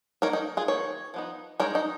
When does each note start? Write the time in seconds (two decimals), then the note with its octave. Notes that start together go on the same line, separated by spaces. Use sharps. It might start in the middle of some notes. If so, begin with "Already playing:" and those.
0.22 D#3 A#3 D#4 A#4 C#5
0.33 D#4
0.57 F4 G#4
0.68 D#3 A#3 C#5
1.14 F3 B3 D#4
1.60 G#3 D#4 A#4 C#5
1.75 D#4